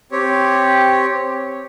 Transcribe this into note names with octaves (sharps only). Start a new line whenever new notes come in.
C4 G4 C#5